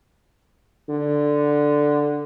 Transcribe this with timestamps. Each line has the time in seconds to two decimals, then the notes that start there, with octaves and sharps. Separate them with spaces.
0.89 D3